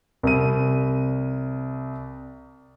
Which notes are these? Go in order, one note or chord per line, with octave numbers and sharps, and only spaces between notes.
C2 D#7